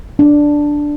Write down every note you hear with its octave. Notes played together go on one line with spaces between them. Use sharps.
D4